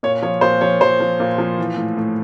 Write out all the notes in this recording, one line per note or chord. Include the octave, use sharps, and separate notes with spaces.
A#2 C#5
F3 C#5
A#2 C5
F3 C#5
F3 C5
F3
A#2
F3
E3
A2
A2